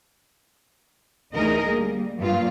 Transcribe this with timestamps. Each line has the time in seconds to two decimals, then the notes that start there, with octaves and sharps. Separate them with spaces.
1.34 D2 E3 D#4 G#4 A#4 D#5
1.68 G3 A#3
2.18 G2 F#3 A#3 F4